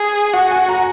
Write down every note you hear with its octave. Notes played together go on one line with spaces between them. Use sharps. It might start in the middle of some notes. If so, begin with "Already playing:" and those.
Already playing: G#4
F#4 F#5
G#5
A#5